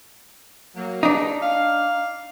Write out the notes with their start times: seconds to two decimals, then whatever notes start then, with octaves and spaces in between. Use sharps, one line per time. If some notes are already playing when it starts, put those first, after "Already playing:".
0.76 F#3 A#3
1.03 G3 D4 D#4 G#4 B4
1.42 F5